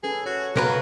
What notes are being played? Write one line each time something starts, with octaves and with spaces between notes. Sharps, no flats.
C#4 G#4 A4 B4
F#4 C#5
B1 C#3 F#3 A#4 B4 F5